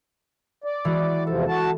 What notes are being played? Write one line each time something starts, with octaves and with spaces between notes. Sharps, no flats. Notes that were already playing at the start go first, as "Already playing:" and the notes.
D5
E3 G#3 F#4
E2 C3 F3 A4
F#4 A5